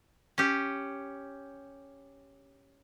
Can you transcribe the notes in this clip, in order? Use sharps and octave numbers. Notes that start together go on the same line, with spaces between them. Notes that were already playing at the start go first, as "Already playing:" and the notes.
C#4 G4